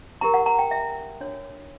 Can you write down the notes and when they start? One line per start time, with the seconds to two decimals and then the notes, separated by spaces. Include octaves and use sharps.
0.21 E4 G4 A#4 A#5
0.34 F#5
0.46 A#5
0.59 G5
0.71 E5
1.21 D4 F#4 C#5